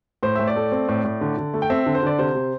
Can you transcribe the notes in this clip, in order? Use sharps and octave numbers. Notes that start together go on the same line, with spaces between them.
A2 C5
A2 E5
D5
A3
C4
A2
A2
D3
D3
A3
G5
C4 E5
D3
C5
D3 D5
C3 C5
C3